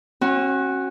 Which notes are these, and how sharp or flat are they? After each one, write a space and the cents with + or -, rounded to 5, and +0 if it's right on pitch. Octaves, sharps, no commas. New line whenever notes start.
C#4 -40 F#4 +0